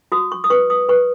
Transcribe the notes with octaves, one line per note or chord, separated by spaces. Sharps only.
F#4 D#6
C#6
D#6
B4 C#6
D#6
B4 C#6